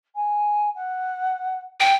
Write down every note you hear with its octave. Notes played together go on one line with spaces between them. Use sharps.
G#5
F#5
G5